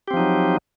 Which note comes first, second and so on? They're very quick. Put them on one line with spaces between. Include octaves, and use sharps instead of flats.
G4 C4 F3 D#4 F#3